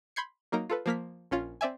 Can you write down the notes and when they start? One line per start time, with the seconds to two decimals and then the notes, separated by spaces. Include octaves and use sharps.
0.16 B5 C6 G6 G#6 C7 C#7
0.52 F#3 A#3 D#4 A#4
0.70 F4 A4 B4
0.86 F3 A#3 F6 B6
1.31 A#1 C#4 F4
1.61 C4 D5 E5 G#5